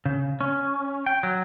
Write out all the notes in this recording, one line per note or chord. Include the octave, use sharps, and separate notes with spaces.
C#3
C#4
G5
F#3